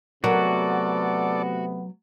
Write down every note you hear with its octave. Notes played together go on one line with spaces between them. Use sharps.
C3 F#3 A3 B3 F#4 A4 A#4 D5